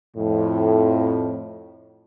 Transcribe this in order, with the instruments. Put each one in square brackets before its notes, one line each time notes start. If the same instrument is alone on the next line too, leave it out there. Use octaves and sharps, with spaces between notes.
[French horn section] F2 A2